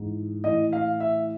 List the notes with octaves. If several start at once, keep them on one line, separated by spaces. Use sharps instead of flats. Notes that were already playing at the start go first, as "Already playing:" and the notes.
Already playing: G#2 E3
A2 E3 D#5
F5
E5